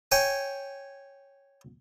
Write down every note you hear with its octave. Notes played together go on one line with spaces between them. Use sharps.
C#5 G5 G#5